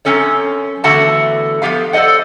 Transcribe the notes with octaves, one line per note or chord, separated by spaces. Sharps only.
F#2 F3 C4 C#4 A4 C#5
E2 D3 A3 F#4 F#5 A5
F3 G#3 B3 G4 F5
A4 C5 D5 D#5 F#5